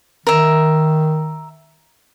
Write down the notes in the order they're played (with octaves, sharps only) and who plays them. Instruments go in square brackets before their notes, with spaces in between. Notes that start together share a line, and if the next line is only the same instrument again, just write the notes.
[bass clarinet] D#3 [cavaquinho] A#4 E5